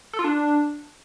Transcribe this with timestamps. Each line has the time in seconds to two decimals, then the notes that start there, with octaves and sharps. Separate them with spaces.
0.13 A4
0.19 F4
0.24 D4